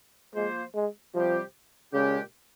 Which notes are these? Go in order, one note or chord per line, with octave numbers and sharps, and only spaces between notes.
F3 G#3 A#3 F4 C5
G#3
C3 F3 G3 C4 G4 C5
A#2 C#3 G#3 C#4 G4